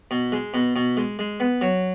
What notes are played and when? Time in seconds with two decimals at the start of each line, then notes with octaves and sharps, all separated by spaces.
0.11 B2
0.32 G#3
0.54 B2
0.76 B2
0.97 G#3
1.19 G#3
1.40 B3
1.61 F#3